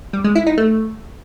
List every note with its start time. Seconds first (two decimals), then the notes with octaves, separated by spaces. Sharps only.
0.13 G3
0.24 G#3
0.35 E4
0.47 D#4
0.58 A3